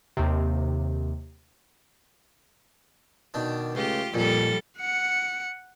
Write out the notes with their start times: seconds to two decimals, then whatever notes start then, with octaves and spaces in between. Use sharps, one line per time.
0.17 D#2 C3
3.34 B2 D#3 D4
3.75 C#2 A3 F4 G4
4.14 F2 A#2 F3 G3 A4
4.79 F#5 C#7